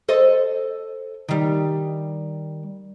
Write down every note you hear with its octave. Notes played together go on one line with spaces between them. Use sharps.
A4 C5 D#5
D#3 G3